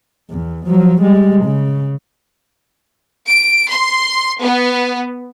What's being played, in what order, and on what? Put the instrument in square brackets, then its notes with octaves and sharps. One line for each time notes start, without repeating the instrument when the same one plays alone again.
[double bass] E2
F3 F#3
G3 G#3
C#3
[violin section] D7
C6
B3